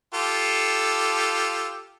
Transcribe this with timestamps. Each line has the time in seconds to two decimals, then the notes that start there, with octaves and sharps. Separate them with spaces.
0.14 F4 G4 A4